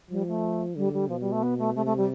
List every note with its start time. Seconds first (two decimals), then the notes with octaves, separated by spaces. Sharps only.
0.11 F3 G3
0.28 A3
0.76 D3 G3
0.94 G3
1.09 B2 F3
1.21 G3
1.32 A3
1.43 B3
1.59 A3
1.76 C3 A3
1.86 A3
1.97 G3